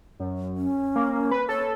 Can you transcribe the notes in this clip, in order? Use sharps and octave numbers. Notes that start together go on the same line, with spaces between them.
F#2
C#4
A#3
B4
A4 C#5